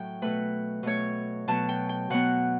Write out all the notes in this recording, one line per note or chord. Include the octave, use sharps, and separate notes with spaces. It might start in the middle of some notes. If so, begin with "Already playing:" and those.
Already playing: A2 F#3 G5
B2 A3 B4
B2 A3 C#5
B2 F#3 B3 A5
G5
G5
B2 F#3 B3 F#5